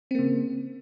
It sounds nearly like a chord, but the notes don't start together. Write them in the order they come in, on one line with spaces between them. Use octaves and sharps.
C4 A#3 C#3